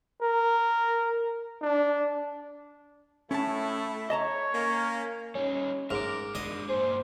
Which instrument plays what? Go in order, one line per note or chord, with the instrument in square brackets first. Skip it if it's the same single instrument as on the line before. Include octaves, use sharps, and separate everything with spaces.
[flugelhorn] A#4
D4
[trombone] A2 [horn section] A3 E4 [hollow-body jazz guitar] C#4 A5
[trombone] C#5 [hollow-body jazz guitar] D#5 A5 A#5
[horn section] A#3 C#4
[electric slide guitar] G3 D#4 [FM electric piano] C#4
[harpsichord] G#2 [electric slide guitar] A#4 [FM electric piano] D6 F6
[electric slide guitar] G#3 D4 [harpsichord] D#5
[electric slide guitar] G2 A#2 G#4 [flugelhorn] C5